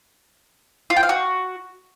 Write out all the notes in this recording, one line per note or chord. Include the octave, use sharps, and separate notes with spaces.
F4
G5
F5
F#4